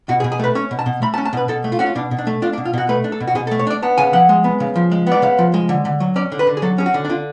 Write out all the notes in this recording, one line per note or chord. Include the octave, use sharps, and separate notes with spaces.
B2 F#4
G#4
B2
G#4
A3 B4
C#4 C#5
B2
A5
B2
A3 B5
A5
C#4
A5
B2 B4
B2 A4
A3
F4
C#4 F#4
F4
B2 D4
B2
D4
A3
D4 F4
D4
B2
F4
B2 F#4
A3 B4
D4
A4
B2
F#4
B2 G#4
A4
A3
C#5
D4 D5
B3 A5
C#3 G#5
F3 F#5
G#3
B3
C#3
F3
G#3
B3
D5
C#3 F5
F3
G#3
D3
D3
F#3
C#4 D5
D3
B4
D3
G#4
F#3 A4
C#4 G#4
F#4
D3
D4
D3 F4